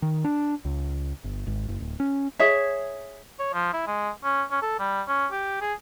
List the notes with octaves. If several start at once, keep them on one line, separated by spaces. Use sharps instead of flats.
D#3
D4
C#2
G1
G#1
F#1
D1
C#4
G#4 C#5 E5
C#5
F3
E4
G#3
C#4
C#4
A4
G3
C#4
G4
G#4